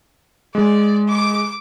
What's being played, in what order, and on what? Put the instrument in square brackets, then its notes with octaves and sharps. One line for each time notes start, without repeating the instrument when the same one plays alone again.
[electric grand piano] G#3 [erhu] D5
[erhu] D6